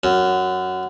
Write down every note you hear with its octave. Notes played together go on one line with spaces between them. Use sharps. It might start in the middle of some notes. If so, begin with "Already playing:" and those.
F#2